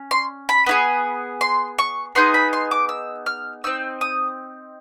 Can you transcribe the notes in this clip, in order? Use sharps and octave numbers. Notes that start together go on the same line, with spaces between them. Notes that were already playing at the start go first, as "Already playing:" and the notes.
Already playing: C#4
C6
B5
B3 E4 G#4
C6
C#6
B3 D#4 G#4 C6
B5
C6
D6
E6
F6
C4 D#4 E6
D#6